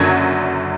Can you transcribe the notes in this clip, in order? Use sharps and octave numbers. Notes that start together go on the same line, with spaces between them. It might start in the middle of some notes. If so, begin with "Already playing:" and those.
Already playing: F#1 F#2 D3 F#3 G#6